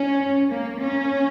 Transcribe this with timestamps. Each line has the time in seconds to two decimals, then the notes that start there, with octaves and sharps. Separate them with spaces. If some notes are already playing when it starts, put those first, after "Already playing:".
Already playing: C#4
0.50 A#3
0.82 C#4